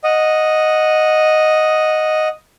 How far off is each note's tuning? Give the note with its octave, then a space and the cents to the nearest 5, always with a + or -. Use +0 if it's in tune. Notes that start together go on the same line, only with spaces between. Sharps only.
D#5 +0 F#5 -10